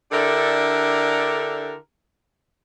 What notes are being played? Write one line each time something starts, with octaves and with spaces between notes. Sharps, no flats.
D3 D4 E4 G4 A4 A#4